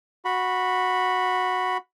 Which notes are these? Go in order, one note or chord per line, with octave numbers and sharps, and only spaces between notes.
F#4 B5